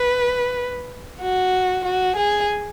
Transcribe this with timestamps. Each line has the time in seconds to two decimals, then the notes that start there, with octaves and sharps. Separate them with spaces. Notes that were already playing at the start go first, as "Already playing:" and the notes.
Already playing: B4
1.21 F#4
1.85 F#4
2.16 G#4